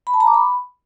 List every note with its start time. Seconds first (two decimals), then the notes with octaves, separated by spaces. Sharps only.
0.07 B5
0.14 A5
0.20 A#5
0.27 D6
0.34 B5